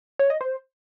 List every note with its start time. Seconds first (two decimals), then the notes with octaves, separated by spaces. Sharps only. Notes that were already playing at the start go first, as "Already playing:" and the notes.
0.19 C#5
0.30 D#5
0.41 C5